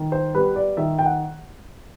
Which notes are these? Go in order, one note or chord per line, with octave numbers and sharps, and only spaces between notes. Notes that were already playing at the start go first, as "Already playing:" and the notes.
Already playing: D#3
C5
G3 B3 B4
D5
D#3 E5
G5
F#5